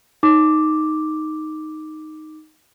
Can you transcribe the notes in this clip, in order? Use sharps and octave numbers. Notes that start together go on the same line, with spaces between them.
D#4 D6